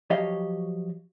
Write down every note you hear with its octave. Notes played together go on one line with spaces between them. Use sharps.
F3 F#3 G4 C#5 D#5 F5